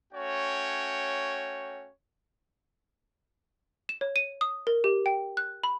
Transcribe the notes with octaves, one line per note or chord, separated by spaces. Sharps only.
A3 C#4 F#4 C#5 G5
E7
C#5
D#7
D#6
A#4
G4
G5
F#6
B5